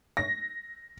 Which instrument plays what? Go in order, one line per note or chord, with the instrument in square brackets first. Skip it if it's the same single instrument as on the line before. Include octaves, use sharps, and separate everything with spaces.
[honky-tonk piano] A#6